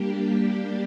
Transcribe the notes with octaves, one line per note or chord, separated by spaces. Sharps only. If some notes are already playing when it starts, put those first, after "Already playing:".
Already playing: G3 A#3 D4 G4